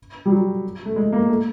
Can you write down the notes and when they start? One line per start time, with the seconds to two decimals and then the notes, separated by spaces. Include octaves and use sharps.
0.26 G3
0.31 F#3
0.85 A3
0.96 G#3
1.12 A#3
1.29 A3